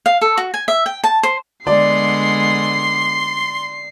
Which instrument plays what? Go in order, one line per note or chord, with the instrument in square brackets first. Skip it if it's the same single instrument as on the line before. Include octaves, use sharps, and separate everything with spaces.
[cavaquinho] F5
A4
F#4
G#5
E5
G5
A5
C5
[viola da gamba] D3 G#3 B3 [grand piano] D5 [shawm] C6 [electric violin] C7